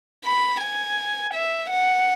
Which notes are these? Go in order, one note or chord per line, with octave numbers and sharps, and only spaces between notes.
B5
G#5
E5
F#5